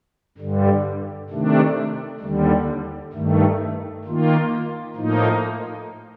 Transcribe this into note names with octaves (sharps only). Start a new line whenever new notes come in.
G2 D3 G3
C3 D#3 A3 D4
D#2 D3 G3
G2 D#3 A3
D#3 A#3 F4
A2 F3 A#3 D#4